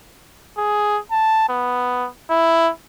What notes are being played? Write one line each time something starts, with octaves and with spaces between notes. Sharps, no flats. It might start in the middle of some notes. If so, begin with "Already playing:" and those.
G#4
A5
B3
E4